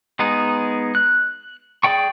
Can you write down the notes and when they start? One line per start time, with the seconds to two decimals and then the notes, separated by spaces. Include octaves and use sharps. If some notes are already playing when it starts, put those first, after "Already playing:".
0.19 G#3 B3 D#4 G#4
0.95 F#6
1.83 G#4 D5 G5 C#6